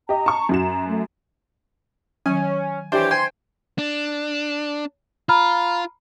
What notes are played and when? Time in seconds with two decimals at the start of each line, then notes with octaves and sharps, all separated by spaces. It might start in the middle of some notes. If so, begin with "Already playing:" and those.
0.09 G4 D#5 A#5
0.26 A5 C#6
0.49 F#2 F#4 E7
0.63 A#5
0.88 A3
2.26 D#3 F#3 C#4 G#5
2.92 E3 D4 G4 C5 C#5 E5
3.11 C5 G5 G#5 C6 G#6
3.78 D4
5.29 F4 A#5 B5 F6